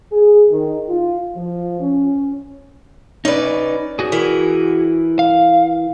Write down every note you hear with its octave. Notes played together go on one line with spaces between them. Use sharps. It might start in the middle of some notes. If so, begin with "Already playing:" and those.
G#4
D#3
F4
F3
C#4
C#4 D#4 B4 D5
F#4 G#4
E3 E4 A#4
F5